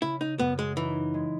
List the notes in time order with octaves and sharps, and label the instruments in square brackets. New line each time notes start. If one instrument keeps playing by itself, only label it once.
[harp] C#3 [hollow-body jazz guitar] E4
[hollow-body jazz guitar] D#4
[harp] F#2 [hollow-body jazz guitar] B3
[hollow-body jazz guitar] G#3
[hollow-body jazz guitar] E3 [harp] D#4
[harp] G#3